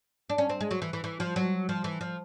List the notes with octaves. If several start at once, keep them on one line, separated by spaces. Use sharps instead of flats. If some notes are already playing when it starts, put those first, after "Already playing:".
D4
C#4
C4
G#3
F#3
E3
E3
E3
F3
F#3
F3
E3
F3